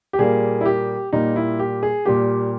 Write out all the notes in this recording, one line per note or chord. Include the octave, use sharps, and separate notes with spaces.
G4
A#2 G3 A#3 G#4
E4
G4
A#2 G3 A#3 D#4
E4
G4
G#4
A#2 G3 A#3 G4